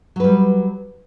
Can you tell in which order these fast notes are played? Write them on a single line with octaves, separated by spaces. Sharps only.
F#3 B4 G3